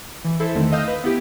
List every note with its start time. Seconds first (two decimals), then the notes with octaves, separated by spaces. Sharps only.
0.24 E3
0.40 E4 A4 C5 E5
0.54 E2 D3 D#3 A3 C4
0.72 D#5 F5 D#6 E6 G6
0.87 B4
1.04 B3 E4 G4